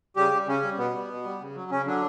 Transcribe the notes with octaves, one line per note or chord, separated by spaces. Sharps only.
C#3 G3 G4
G3
C#3 C#4
G3
B2 B3
G3
B2
G3
C#3
F#3
C#3 C#4
D3 F#3 D4